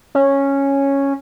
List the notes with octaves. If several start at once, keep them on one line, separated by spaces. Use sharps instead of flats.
C#4